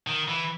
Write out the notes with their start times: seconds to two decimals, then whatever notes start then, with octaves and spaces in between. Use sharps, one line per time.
0.07 D#3
0.28 E3